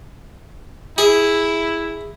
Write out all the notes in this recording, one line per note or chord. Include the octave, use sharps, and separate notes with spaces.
E4 G#4